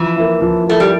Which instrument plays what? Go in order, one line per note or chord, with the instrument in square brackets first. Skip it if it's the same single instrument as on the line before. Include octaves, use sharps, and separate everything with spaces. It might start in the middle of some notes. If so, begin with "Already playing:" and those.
Already playing: [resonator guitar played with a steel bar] E3 [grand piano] F3
[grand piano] A#3 E4
F3
[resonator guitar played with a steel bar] A3 [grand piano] A#3 E4
[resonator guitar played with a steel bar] G3